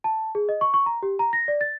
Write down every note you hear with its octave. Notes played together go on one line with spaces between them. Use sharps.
A5
G#4
D#5
C#6
C#6
A#5
G4
A#5
A#6
D5
A6